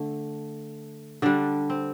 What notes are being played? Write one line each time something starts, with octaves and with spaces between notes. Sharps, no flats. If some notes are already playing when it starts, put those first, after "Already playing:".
Already playing: D3 A3
D3 G3 D4
C4